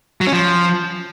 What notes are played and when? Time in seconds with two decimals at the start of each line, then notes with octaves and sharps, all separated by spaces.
0.21 F#3
0.27 C#4
0.33 F3